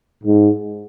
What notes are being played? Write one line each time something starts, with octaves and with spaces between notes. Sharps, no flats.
G#2